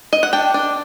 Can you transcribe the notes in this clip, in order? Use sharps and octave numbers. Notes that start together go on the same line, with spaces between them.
D#5
F#5
D4 G5
D4